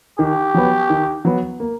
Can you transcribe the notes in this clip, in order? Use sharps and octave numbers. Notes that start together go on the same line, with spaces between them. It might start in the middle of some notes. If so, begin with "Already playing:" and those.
D#3 G4
F#3 B3
D#3
F#3 B3
A#3